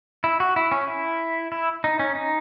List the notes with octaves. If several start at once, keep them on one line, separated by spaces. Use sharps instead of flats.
E4
F#4
E4
C#4
E4
E4
D#4
C#4
D#4